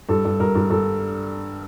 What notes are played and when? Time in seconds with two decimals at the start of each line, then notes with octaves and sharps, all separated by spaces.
0.09 G2 A4
0.25 G2
0.40 G2 A#4
0.55 G2
0.70 G2 A4